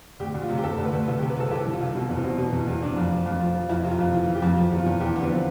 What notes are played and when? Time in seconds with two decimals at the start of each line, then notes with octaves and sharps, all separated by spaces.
0.20 D2 G4
0.34 D2
0.42 F4
0.49 C3
0.58 G4
0.64 D2 A4
0.78 D2
0.85 B4
0.93 D2
1.07 C2
1.18 G4
1.22 C3
1.29 B4
1.37 C2 A4
1.51 C2 G4
1.66 E3
1.73 F4
1.80 C2
1.95 B2 F4
2.09 E2
2.16 C4
2.24 B2
2.38 B2
2.52 E2
2.67 E2
2.82 C3 D4
2.97 F2
3.11 F3
3.26 F2
3.40 F3
3.55 F3
3.69 F2 E4
3.84 C3
3.91 F4
3.99 F2
4.13 E3 F4
4.28 E3
4.35 G4
4.42 F2
4.57 F3 F4
4.71 E2
4.79 F4
4.86 E2
5.00 E2 G4
5.15 D3 B3
5.23 C4
5.29 F3